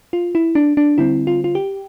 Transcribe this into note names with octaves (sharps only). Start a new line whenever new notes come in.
F4
E4
D4
D4
D3 G3 C4 E4
F4
F4
G4